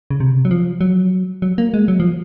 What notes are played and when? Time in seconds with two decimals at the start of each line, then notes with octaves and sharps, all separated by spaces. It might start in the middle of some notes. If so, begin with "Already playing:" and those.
0.11 C#3
0.20 C3
0.45 F#3
0.51 F3
0.81 F#3
1.42 F#3
1.58 A#3
1.74 G#3
1.88 F#3
2.00 F3